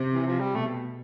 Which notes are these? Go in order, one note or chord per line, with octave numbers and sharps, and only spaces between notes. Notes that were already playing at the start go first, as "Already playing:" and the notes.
Already playing: C3
E3
F3
G3
B2 A3